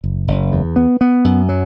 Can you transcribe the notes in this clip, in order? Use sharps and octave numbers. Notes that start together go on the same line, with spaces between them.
F#1
F#1
E2
B3
B3
F#2
F#3